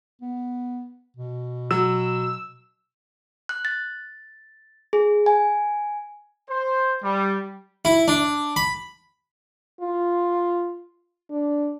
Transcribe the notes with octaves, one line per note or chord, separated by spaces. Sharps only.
B3
B2
F#3 E6
F#6
A6
G#4
G#5
C5
G3
E4
D4
B5
F4
D4